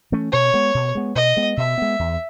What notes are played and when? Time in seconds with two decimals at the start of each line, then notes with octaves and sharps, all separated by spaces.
0.12 E3 A3 C#4
0.32 B2 C#5
0.54 G#3 B3
0.74 B2
0.95 G#3 B3
1.15 B2 D#5
1.37 G#3 B3
1.57 B2 E5
1.78 G#3 B3
1.99 E2